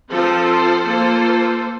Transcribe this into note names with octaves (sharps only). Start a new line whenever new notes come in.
F3 C4 F4 A4 C5
A#3 F4 A4 C5